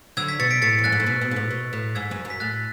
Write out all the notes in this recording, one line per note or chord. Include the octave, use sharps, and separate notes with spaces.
D3 F#3 E6 G#6
G#6 B6
B2 A6 C#7
B6 D7
A2 A6 C#7
E2
F#2 F#6 A6
G#2
A2
B2
B2
G#2
A2
B2
A2
G#2 E6 G#6
F#2
F#2
B6
A2 F#6 A6